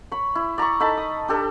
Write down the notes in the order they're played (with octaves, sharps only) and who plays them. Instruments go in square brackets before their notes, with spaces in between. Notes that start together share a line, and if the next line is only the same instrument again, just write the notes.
[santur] C#5 B5
E4
D5 A#5 B5 C#6
D#4 A4 A5 B5
D#6
D4 G4 A4